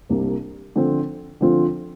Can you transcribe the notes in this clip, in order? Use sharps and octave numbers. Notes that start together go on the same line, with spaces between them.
C2 C3 G3 A#3 D4
D3 F3 C4 F4
D3 F3 C4 F4